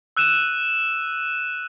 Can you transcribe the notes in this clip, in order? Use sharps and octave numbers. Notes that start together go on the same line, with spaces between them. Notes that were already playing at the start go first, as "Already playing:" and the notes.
E6 F#6 D#7 E7